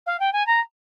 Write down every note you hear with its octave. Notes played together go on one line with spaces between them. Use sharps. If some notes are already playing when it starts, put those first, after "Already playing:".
F5
G5
G#5
A#5